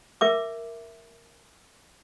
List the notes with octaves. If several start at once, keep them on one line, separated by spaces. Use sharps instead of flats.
A#4 E5 D6